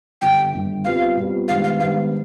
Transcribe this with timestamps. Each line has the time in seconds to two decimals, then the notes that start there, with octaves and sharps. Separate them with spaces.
0.22 G1 G2 D3 G5
0.53 G1 G2 D3
0.85 B2 G3 C4 F4 B4 F5
1.17 B2 G3 C4 F4 B4
1.48 G#2 D#3 G3 B3 D4 F5
1.64 F5
1.80 G#2 D#3 G3 B3 D4 F5